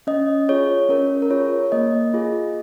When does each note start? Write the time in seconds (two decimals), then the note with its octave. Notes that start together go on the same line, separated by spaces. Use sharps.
0.07 C#4 D#5
0.49 F4 G#4 C#5
0.89 C#4 A#4
1.22 A#4
1.30 F4 G#4 C#5
1.72 A#3 D#5
2.14 F4 G#4